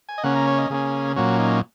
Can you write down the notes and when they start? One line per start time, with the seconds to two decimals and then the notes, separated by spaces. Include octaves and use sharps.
0.09 G#5
0.18 D#5
0.24 C#3 A#3 C#4 F#5
0.36 A#5
0.47 C#5
0.58 D#5
0.70 C#3 A#3 C#4 G#4
1.16 A#2 F#3 A#3 C#4 F#4
1.39 D#4